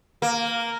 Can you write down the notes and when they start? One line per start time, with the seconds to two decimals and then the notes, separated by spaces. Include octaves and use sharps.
0.22 A#3